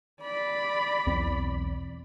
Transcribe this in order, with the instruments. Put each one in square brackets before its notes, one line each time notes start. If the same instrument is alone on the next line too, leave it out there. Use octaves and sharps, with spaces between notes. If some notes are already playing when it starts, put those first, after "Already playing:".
[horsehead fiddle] D5 B5
[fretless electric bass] B1 E2 C4